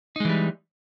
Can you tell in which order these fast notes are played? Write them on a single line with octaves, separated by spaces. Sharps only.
D#4 G#3 E3 G3